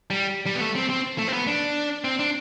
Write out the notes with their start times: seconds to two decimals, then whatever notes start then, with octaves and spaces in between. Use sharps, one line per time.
0.10 G3
0.46 G3
0.55 B3
0.61 A3
0.75 C4
0.89 C4
1.18 A3
1.28 C4
1.33 B3
1.47 D4
2.04 C4
2.19 D4